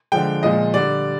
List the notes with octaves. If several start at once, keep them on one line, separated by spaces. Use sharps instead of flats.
D3 F3 G#3 G5
A#2 F3 G#3 D#5
D3 G3 D5